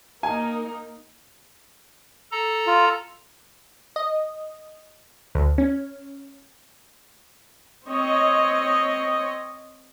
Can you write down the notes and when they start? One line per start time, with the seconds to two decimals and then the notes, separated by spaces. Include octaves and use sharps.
0.23 A#3 D#4 A#4 G#5
2.32 A4 A#5
2.67 F4
3.96 D#5
5.35 D2
5.58 C#4
7.88 C4 C#5 D#5